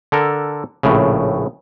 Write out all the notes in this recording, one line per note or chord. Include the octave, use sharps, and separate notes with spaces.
D3 A4 A#4
A#1 A2 C#3